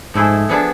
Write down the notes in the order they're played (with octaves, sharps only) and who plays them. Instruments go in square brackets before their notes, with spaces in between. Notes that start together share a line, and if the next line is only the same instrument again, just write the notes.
[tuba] G#2 [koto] F3 A3 E4 G#4
[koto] F3 B3 D4 G#4